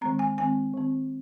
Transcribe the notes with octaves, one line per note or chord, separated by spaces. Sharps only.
D#3 G#3 C4 A#5
G#5
D#3 G#3 C4 G#5
D#3 C4